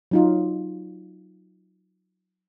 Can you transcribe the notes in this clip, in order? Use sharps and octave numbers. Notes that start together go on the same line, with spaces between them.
F#3 D#4 F4